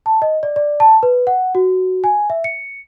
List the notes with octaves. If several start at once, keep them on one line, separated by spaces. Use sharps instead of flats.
A5
D#5
D5
D5
A5
B4
F#5
F#4
G#5
E5
C#7